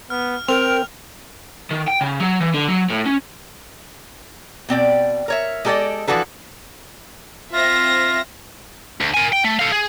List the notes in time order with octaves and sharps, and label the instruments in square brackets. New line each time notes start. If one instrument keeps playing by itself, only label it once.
[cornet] B3 [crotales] F6
[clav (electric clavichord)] C4 [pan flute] A#4 [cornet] G5 [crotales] F7
[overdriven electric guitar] D#3
G5
C#3
F#3
E3
D3
F#3
A2
C#4
[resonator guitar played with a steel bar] B2 C4 D5 G5
A#4 C#5 E5
G#3 G4 A4 A#4 D5 D#5
E3 F3 D4 F#4 A4 B4
[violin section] C4 E5 A#6 [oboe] F4
[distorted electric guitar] D2
A#4 G#5
G5
A3
A4 F5
G#4